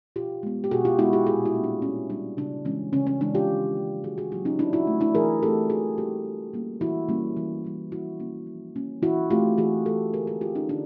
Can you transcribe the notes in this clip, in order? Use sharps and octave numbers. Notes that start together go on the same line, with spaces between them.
B2 F4 G4
G#3 B3
G4
B2 F#4 G#4
F4 G4
G#3 B3 E4 F#4
F4 G4
A#2 F#4 G#4
E4 F#4
G3 A#3 C#4
D4
A#2 C#4
G3 A#3 C#4 D4
C#3 D4
E3 G#3 C#4
C#3 C#4
C#4
E3 G#3 C#4 D4
F4 G4
D#3
F#3 A#3 C#4
D#3 F#4 G#4
F#4 G#4
F#3 A#3 C#4 F4 G4
C#4 D#4
E3 D4 E4
E4 F#4
A3 C4
D4 E4
E3 G#4 A#4
A3 C4 G4 A4
E3 F#4 G#4
G3 A#3 C#4 F4 G4
E3
G3 A#3 C#4
E3 E4 F#4
G3 A#3 C#4
E3
G3 A#3 C#4
F3 E4 F#4
A#3 C#4
F3
A#3 C#4
E3 E4 F#4
A3 C4 F4 G4
E3 F#4 G#4
A3 C4 G4 A4
D3 G#4 A#4
F#4 G#4
F3 A3 C4 F4 G4
C#4 D#4
D3 D4